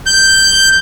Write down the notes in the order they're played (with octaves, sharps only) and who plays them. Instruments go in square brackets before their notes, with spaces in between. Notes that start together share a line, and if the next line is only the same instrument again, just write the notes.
[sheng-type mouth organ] G6